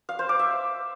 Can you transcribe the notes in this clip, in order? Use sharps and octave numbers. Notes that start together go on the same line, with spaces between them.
F5
C5
D6
E5